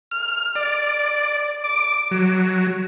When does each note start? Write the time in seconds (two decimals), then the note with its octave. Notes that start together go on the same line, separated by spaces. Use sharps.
0.11 F6
0.56 D5
1.64 D6
2.11 F#3